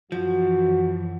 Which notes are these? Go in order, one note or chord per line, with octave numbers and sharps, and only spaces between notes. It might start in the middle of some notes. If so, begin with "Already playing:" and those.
F#2 E3 F3 F#4